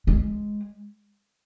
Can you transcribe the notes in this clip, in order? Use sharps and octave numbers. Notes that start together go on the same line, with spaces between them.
G#3